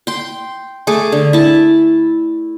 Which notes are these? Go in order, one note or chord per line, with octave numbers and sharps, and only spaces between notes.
G5 C6
A3 G#4 D6
D3
E4 A5